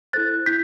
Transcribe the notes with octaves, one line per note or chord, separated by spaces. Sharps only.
E4 A4 C5 F#6 A6
E4 G6 B6